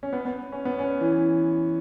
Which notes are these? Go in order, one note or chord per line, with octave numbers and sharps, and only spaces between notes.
C#4
B3
B3
C#4
B3
C#4
B3
E3